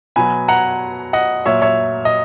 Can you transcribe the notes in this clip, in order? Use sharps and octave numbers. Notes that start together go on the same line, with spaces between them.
B2 F#3 G#5 B5
F#5 A#5
D#5 F#5
A#2 F#3 C#5 E5
C#5 E5
D#5